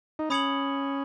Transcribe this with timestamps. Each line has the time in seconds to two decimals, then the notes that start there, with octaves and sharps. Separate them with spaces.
0.19 D#4
0.30 C#4 B5 D#6 G#6 C#7 F#7